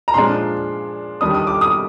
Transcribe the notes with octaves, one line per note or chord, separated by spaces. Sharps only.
A#5
A#2 F3 G#3 D4 C6
D#3 G3 D4 D#6
D#6
D6
D#6